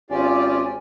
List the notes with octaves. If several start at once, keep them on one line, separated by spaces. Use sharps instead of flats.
G#1 C#4 F4 G4 D5 G#5